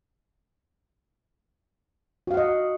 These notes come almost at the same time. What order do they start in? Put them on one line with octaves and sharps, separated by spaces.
F#4 F5 F#5 D#5